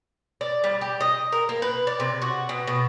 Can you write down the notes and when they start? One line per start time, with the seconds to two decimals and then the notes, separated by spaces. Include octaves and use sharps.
0.41 D5
0.64 G3
0.81 G4
1.01 D#5
1.32 A#4
1.49 A#3
1.62 B4
1.87 D5
2.00 C3
2.22 F#4
2.49 B2
2.67 B2